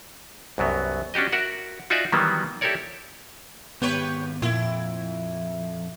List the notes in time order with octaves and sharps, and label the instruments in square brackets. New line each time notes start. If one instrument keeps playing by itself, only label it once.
[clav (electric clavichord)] C2 F#2 F#3 B3
C#4 D4 F#4 G4 D#5
F#4 A#4 E5 F#5
D#4 F4 F#4 D5 E5 G#5
D#3 E3 F#3 G3 A#3 B3
E4 G4 A4 A#4 C#5 D5
[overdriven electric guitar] G#2 D#3 [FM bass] B3 [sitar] G4 B4 C#5
[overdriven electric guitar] F2 [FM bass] A#2 [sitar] E4